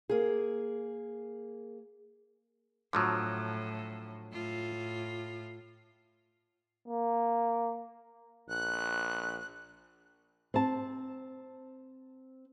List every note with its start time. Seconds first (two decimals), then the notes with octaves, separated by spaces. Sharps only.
0.09 A#3 G#4
2.93 A2 D3 F3 F#3
4.33 A2 F4
6.88 A#3
8.49 A#1 F#6
10.54 C4 A5